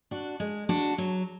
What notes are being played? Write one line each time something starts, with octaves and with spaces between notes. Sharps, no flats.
D4 F#4
G#3
D4 F#4
F#3